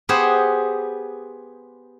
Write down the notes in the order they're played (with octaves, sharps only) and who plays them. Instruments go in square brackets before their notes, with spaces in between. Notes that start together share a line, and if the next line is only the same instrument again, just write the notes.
[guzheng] B3 G4 G#4 B4 C5 F#5